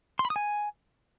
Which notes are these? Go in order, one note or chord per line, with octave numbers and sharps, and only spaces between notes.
C6
B5
D#6
G#5